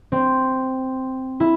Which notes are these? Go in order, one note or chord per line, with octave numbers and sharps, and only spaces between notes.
C4
E4